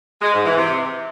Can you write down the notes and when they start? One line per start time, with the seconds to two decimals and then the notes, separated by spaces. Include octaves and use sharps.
0.22 G#3
0.33 G#2
0.45 E3
0.57 C3